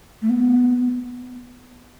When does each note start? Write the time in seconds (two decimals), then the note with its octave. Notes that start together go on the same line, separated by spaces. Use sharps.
0.22 A3
0.29 B3